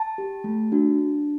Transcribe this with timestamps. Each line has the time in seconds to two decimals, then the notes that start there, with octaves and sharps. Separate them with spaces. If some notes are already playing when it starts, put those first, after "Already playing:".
Already playing: A5
0.18 G4
0.44 A3
0.72 D4 F#4
0.99 D4